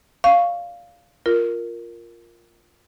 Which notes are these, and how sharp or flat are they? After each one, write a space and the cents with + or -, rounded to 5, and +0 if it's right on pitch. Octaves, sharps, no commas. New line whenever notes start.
D5 -20 F5 +0 C#6 +0
F4 +0 A#4 +0